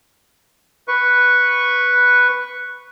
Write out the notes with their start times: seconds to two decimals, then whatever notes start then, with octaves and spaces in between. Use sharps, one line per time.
0.88 B4 C#6